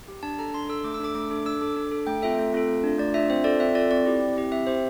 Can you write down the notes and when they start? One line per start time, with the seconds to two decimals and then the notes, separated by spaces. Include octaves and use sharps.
0.08 G4
0.23 D4 A5
0.39 A4 A#5
0.54 D4 C6
0.69 A4 E6
0.84 A3 D6
0.94 E6
1.00 D4 A4 D6
1.15 A3 D6
1.30 D4 A4 D6
1.46 D4 E6
1.61 A4 D6
1.77 D4
1.91 A4
2.07 A3 G5
2.22 C4 F4 A4 E5
2.38 A3
2.53 C4 F4 A4
2.68 A3
2.84 D4 F4
2.98 A3 D5
3.14 D4 F4 E5
3.30 C4 C5
3.44 F4 A4 D5
3.60 C4 E5
3.75 F4 A4 D5
3.91 C4 D5
4.05 E4 G4
4.21 C4
4.37 E4 G4
4.51 C4 E5
4.67 G4 C5